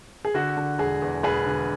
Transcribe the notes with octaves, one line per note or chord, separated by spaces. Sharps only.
G#4
D3 F#4
D3
E1 G#4
E2
E1 G#4 B4
D3